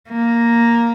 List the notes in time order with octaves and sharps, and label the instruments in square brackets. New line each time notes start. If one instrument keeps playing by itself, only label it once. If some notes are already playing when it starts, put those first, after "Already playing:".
[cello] A#3